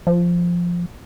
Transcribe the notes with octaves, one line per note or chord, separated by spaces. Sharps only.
F3